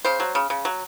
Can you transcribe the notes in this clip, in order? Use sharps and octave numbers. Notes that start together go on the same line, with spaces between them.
C#3 C5
F#3
C#3
C#3
F#3